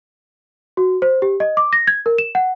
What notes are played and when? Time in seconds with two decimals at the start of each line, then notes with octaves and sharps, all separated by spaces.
0.77 F#4
1.02 C5
1.22 G4
1.40 D#5
1.57 D6
1.73 A#6
1.87 G#6
2.06 A#4
2.18 E7
2.35 F#5